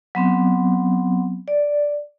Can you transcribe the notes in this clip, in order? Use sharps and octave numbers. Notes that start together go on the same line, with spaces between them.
F#3 B3 C4
D5